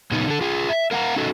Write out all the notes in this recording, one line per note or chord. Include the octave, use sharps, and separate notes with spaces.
A#2 C#3 B3 C#4 D#4
D3 A4
F4 G#4
E5
A#4 F5 F#5 G#5 A#5
C#4 D#4 F#4 A4 D#5